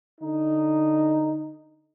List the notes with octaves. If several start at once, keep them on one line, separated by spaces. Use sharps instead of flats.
D3 D#4